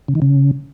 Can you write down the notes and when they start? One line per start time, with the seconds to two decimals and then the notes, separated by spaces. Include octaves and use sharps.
0.08 C#3
0.15 D#3
0.22 C#3